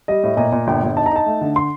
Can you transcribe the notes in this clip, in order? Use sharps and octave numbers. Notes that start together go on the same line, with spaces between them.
G3 D#5
A2
A#2 D#5
A#2
G1 G5
G1
D#4 A5
A#5
D#4 A5
A3
D3
C6